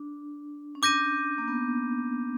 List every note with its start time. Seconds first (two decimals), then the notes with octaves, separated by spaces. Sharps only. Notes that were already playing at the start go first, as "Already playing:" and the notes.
Already playing: D4
0.75 C#4
0.82 D4 D6 G6 A#6 D#7
1.38 A#3
1.48 B3